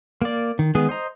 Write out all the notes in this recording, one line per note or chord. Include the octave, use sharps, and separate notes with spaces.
A#3 D5
D#3
D#3 G#3 B3 G#4
C5 D#5 A#5